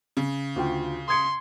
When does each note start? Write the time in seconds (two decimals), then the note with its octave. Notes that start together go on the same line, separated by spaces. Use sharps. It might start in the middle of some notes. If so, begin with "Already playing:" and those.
0.17 C#3
0.56 D2 F4 G5
1.09 C6 D#6 G#6 C#7